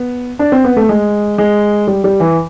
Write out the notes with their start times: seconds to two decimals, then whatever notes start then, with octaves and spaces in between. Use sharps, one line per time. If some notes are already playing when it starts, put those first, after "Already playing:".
Already playing: B3
0.39 D4
0.52 C4
0.64 B3
0.77 A3
0.89 G#3
1.38 G#3
1.87 G3
2.04 G3
2.20 E3